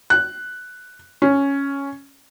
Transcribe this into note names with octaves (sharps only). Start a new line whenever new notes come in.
F#6
C#4